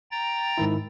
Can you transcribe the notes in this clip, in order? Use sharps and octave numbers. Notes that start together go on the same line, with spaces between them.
G5 A#5 A6
G#2 D#3 E4